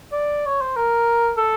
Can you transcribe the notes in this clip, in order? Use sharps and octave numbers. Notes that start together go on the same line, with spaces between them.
D5
C#5
C5
A#4
A4